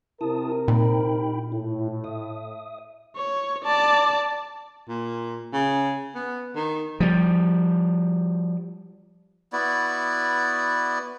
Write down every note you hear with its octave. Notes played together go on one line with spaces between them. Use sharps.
C3 C4 E4 A#4 A5 D#6
A#2 D#4 G5 B5
A2 E4
E5 D#6
C#5
D5 A5
A#2
C#3
B3
D#3
F3 G3
B3 E4 F#4 D5